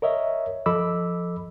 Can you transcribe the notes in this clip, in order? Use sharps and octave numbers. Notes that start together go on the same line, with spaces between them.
A#4 C#5 D#5 E5
F3 A4 D#5 B5 D6 E6